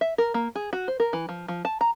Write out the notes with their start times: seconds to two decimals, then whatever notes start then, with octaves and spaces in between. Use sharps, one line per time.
0.01 E5
0.18 A#4
0.34 A#3
0.55 G#4
0.73 F#4
0.88 C5
1.00 A#4
1.13 E3
1.29 F3
1.48 F3
1.65 A5
1.81 A#5